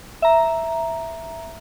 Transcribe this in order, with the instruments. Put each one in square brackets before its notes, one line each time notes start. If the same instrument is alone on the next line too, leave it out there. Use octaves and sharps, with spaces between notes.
[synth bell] E5 A#5